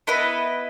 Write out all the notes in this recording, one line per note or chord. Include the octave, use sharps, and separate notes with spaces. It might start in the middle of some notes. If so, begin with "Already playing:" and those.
B3 E4 B4 D#5